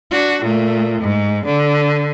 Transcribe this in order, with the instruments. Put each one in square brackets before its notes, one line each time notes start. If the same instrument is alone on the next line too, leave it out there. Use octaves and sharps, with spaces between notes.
[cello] D4 F#4
A#2 A3
G#2
D3